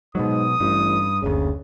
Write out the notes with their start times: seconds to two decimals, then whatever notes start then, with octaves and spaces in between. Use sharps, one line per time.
0.15 G#2 B2 F#3 D#6
0.60 A1 G2
1.22 F#1 D2 C#3